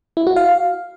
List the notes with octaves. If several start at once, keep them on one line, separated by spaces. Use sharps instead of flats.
E4
F#4
F5